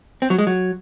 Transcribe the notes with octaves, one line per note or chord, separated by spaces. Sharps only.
C4
F#3
G#3
F#3